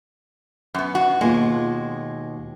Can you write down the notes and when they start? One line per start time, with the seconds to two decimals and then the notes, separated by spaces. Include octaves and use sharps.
0.74 F#2 B3
0.95 F#4
1.21 D#2 B2 G#3 F4